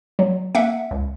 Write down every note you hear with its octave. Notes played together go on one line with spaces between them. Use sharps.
F#3
A#3 E5 F#5
C#2